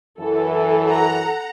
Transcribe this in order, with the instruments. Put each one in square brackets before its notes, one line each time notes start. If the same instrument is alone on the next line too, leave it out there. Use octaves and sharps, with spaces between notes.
[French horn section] F#2 E3 [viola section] A4
[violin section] F#5 A#5